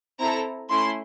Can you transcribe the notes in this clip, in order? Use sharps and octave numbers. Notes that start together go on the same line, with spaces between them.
C4 E4 A4 A#5
A3 C#4 E4 C6